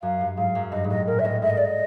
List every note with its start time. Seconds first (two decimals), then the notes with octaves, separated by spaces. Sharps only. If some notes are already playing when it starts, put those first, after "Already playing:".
0.02 F#2 F5
0.21 G2
0.37 G#2 F5
0.55 F#2
0.72 G2 D#5
0.84 G#2
0.89 A2 D#5
1.07 A#2 A#4
1.19 E5
1.24 A2 D#5
1.42 G#2 E5
1.50 D#5
1.57 D5
1.65 D#5